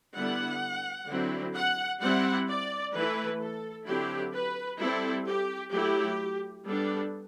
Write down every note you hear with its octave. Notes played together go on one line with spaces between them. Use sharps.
D3 G3 B3 E4 F#5
D3 F#3 C4 E4
F#5
G3 C4 E4 F#5
D5
E3 A3 E4 B4
A4
D3 F#3 C4 E4 G4
B4
G3 C4 E4 A4
G4
F#3 A3 E4 G4
G3 B3 D4 A4